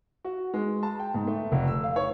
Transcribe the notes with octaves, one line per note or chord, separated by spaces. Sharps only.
F#4
G#3
A5
G5
G#2
A3
F1
E6
F5
C#5